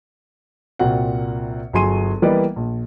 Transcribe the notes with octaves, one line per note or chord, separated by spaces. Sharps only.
C2 A#2 C4 F#4 F#5
G1 F#3 G#4 G#5 C6 D#7
E3 G3 A#3 B3 D5 D#5
A#1